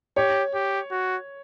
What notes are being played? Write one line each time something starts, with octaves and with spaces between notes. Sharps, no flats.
G4 C#5
G4
F#4